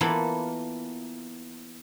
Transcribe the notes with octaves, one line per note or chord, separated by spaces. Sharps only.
E3 A#3 B3 F4 A4 B5